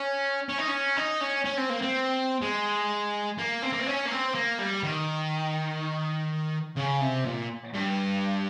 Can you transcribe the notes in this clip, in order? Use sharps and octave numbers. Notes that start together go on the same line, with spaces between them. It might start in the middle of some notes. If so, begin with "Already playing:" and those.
Already playing: C#4
C#4
D#4
C#4
D#4
C#4
C#4
C4
A#3
C4
G#3
A#3
C4
A#3
C4
C#4
A#3
C4
A#3
G3
D#3
C#3
C3
A#2
G2